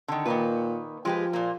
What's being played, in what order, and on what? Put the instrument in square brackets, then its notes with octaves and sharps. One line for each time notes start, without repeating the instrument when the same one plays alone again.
[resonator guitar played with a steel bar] D3 D#3
[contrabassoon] A#2 [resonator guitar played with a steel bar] D#3 A#3 B4
[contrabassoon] F3 [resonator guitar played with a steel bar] G#3 G4 B4
[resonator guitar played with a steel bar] A#2 A#3